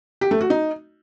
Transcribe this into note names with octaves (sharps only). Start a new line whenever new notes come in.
G4
A3
F#4
D#4